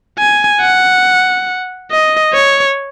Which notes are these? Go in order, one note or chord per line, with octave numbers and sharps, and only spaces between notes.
G#5
F#5
D#5
C#5